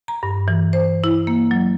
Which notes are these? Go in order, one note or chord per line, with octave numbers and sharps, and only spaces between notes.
A#5
G2
E3
C5
E4
A#3
F#3